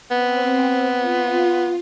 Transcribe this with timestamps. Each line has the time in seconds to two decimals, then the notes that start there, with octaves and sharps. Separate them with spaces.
0.11 B3 C4
0.98 F4